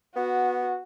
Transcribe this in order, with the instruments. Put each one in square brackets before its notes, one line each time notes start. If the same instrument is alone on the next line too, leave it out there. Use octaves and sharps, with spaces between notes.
[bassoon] B3 [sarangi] F#4